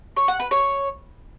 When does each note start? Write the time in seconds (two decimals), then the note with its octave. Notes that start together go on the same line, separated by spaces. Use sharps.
0.16 C#5
0.28 F#5
0.40 B4
0.51 C#5